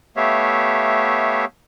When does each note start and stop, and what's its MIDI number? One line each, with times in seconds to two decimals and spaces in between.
0.17 1.45 57
0.17 1.45 59
0.17 1.45 67
0.17 1.45 73
0.17 1.45 76
0.17 1.45 77